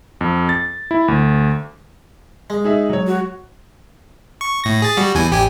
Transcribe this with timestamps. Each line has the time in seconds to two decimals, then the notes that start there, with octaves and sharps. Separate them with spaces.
0.21 F2
0.49 A6
0.91 E4
1.08 D2
2.50 G#3
2.64 D#4 G#4 E5
2.89 F#3 C#5
3.07 F#4
4.41 C#6
4.64 A2 A#6
4.82 G#4 A6
4.97 G3 F#4
5.15 E2 E3 G#5
5.31 A1 G4 G#5